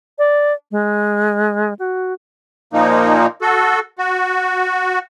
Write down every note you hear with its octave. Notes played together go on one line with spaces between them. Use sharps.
D5
G#3
F#4
A#2 F3 A#3 D#4
F#4 A4
F#4